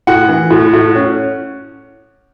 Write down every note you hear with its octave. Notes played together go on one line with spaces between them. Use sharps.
A2 F#5
E3
A2
A2
C#4